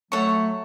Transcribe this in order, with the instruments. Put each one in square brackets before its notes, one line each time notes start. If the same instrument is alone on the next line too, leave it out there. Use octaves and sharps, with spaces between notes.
[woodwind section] F#3 A3 [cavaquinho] A4 C#5 F#5 C#6